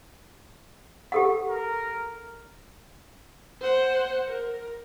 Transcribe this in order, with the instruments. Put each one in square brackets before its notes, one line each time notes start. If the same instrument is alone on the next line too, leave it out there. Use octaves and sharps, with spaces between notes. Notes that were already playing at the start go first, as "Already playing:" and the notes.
[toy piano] G4 A4 F#5
[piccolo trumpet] A#4
[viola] C5 F#5
A#4